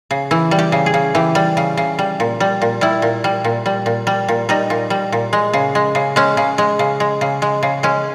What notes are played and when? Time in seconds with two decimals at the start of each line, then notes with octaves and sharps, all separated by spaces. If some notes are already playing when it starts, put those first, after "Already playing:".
0.11 C#3
0.31 E3 E4
0.51 G3
0.59 G4
0.72 C#3
0.86 G#4
0.94 C#3
1.15 E3 G4
1.35 G3
1.57 C#3
1.77 C#3
1.99 G3
2.20 A#2
2.40 G3
2.62 A#2
2.81 G3 E4
3.02 A#2
3.24 G3
3.44 A#2
3.66 G3
3.86 A#2
4.07 G3
4.28 A#2
4.49 G3 D#4
4.70 A#2
4.90 G3
5.12 A#2
5.33 G#3
5.54 C#3
5.75 G#3
5.95 C#3
6.16 G#3 C#4
6.37 C#3
6.58 G#3
6.79 C#3
7.00 G#3
7.21 C#3
7.42 G#3
7.63 C#3
7.83 G#3 C#4